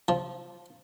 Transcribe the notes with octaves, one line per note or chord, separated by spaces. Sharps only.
F3